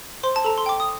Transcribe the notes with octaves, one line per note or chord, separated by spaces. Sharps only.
C5 C6
A5
A4 A#5
C6
G5 D6
D#6